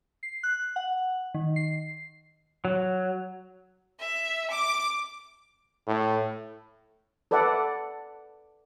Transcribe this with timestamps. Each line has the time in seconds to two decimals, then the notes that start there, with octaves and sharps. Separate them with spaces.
0.23 C7
0.43 F#6
0.76 F#5
1.34 D#3
1.56 C7
2.65 F#3
4.00 E5
4.50 D6
5.87 A2
7.31 A4 B4 D5 E5 F#5